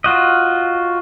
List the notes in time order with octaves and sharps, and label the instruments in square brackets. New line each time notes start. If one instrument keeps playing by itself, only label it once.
[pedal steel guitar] F4 F#4 D#5